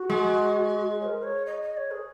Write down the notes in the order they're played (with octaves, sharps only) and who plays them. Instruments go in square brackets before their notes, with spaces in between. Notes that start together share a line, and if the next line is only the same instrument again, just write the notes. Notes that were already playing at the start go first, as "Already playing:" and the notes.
Already playing: [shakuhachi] F#4
[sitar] G#3
[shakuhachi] C#5
A#4
C#5
D#5
D#5
C#5
G#4